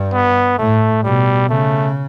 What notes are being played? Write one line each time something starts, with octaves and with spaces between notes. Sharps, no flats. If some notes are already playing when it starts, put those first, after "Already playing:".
Already playing: G2
B3
A2 A3
B2 G3
C#3 A3